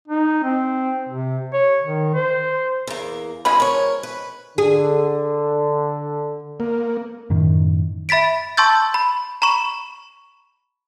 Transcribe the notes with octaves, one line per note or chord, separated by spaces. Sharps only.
D#4
C4
C3
C#5
D#3
C5
E2 A#3
C#3 F3 G#3 F4 G#4 B5
A#4 C#5
B4
D3 G#4
A#3
F#2 A2 D#3
E5 B5 A6 B6 D7
A5 C6 C#6 E6 G6 A6
B5
A#5 B5 C#6 E7